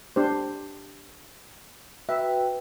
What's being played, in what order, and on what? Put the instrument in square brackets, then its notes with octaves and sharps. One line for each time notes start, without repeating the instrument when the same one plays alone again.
[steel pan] D4 G4 C5
[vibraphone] F#4 B4 G5 [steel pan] E5